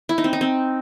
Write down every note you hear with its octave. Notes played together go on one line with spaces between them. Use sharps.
E4
D#4
C4
D#4
C4